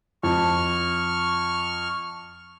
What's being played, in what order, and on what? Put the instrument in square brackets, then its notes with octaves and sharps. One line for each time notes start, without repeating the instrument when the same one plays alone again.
[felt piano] F2 [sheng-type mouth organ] C#6 F6